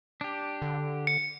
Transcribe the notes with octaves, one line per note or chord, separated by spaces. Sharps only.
D4 G4
D3
C#7